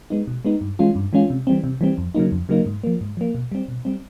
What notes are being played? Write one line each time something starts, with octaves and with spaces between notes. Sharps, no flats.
G#3 B3 D#4
B2
G#3 B3 D#4
G2
E3 G#3 C#4 F4
G2
E3 G#3 C#4 F4
C3
E3 G3 C4
C3
E3 G3 C4
F2
C#3 F#3 A#3 D#4
F2
C#3 F#3 A#3 D#4
G#2
F3 A#3
G#2
F3 A#3
B2
G3 C4
B2
G3 C4